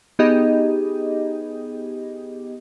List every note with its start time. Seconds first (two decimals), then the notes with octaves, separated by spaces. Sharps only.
0.19 B3 D#4 G4 G#4 D#5